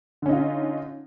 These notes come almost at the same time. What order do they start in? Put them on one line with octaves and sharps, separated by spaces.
D3 C#4 D#4 F4